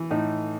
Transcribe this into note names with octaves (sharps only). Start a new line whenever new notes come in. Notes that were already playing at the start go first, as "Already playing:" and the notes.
Already playing: E3
A2 D#4